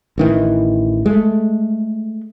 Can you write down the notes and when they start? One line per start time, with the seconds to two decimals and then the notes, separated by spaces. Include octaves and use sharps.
0.18 A1 D#3 E3
1.06 G#3 A3